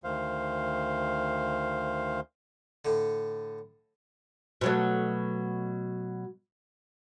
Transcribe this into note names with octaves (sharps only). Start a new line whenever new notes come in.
D2 D#3 C5 F5
A2 D3
B2 F#3 A3